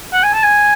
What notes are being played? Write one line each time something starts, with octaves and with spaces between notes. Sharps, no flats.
F#5
G#5
A5
G#5